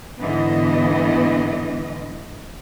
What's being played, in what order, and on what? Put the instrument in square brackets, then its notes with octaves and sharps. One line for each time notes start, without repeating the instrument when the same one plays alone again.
[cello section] G#2 D3 E3 B3 D#5